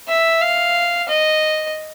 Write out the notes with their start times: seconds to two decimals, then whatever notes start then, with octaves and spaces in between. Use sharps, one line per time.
0.08 E5
0.42 F5
1.09 D#5